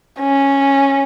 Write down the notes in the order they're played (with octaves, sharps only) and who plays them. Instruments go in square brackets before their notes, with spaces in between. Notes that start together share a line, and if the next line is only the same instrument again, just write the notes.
[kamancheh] C#4